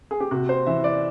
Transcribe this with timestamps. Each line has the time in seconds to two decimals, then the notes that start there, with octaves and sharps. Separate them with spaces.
0.11 G#4
0.20 G4
0.31 C3 F#4
0.49 C5
0.66 E3 E5
0.84 D5